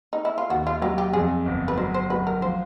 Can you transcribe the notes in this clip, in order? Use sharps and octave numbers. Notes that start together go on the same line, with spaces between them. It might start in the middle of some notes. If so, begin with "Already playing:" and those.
D#4
E4
F4
D#2 F#4
F4
F#3 G4
G4
F2 G#4
G1
B4
F#3 C5
C5
F#3 B4
A#4
F3 C5